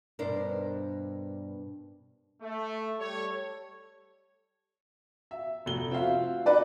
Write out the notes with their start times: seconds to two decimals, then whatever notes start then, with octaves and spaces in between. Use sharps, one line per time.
0.19 G2 B2 D4 A#4 C5
2.41 A3
2.99 G3 A4 C#5
5.31 E5
5.66 F1 G7
5.91 C4 F4 F#4 E5 F5
6.46 D#4 B4 D5